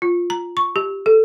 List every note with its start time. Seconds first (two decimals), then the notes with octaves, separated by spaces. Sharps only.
0.02 F4
0.30 A#5
0.57 C#6
0.76 G4
1.06 A4